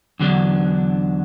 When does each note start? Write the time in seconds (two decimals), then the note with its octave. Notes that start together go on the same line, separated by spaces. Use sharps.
0.19 E2 D3 F#3 D4